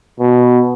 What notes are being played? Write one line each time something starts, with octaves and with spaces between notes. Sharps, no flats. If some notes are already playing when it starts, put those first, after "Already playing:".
B2